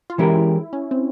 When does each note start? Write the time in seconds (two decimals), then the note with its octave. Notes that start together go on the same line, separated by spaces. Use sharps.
0.10 F4
0.18 E3 G#3 C#4 E4 G4 A#4
0.73 C#4
0.91 C4